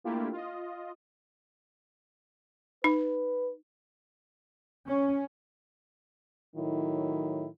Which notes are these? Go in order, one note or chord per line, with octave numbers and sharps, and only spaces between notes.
A3 A#3 D4 E4 F4 G4
F4 D#5
D#4 B4
C#4
A2 D#3 F#3 E4